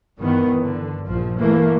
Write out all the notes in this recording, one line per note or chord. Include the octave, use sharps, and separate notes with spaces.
G2 D#3 E3 B3
D3
A#1 F3
E3 A3 A#3